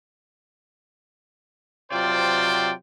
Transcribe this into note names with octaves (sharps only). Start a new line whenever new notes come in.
C3 F#3 F4 C5 D5 G5